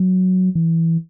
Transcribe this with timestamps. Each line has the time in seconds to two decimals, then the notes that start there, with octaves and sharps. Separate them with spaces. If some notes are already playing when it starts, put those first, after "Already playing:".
Already playing: F#3
0.55 E3